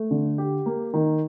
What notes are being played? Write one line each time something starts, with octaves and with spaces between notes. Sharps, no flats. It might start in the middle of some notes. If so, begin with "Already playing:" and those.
Already playing: A3
D3
G4
A#3
D#3